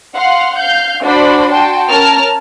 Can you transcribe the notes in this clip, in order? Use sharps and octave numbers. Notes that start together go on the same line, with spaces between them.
F5 F#5 C6
F5 G6
D4 F#4 C5 D5 B5
F#4 G5 A5 C6
C#4 A#4 A5 F6